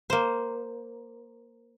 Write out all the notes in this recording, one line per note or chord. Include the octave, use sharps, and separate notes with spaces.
A#3 C5